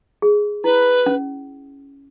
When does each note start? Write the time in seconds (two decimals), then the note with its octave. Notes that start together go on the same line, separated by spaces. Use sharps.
0.22 G#4
0.64 E4 B4
1.06 C#4